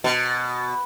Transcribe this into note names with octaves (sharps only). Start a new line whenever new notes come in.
B2